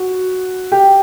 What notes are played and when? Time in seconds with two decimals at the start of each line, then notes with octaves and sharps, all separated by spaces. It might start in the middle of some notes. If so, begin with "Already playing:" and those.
Already playing: F#4
0.72 G4